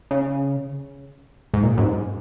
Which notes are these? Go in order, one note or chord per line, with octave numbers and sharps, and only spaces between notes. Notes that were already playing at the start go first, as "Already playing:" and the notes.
C#3
G#2
A#2
F#2
G#2